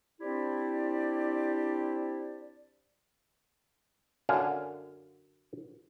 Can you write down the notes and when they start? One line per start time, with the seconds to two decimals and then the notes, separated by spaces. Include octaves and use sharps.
0.20 C4 D4 E4 G4 C5 D5
4.29 F#2 D3 F5 F#5 G#5